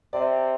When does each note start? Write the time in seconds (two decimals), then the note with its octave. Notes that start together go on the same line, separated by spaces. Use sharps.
0.13 C3 D5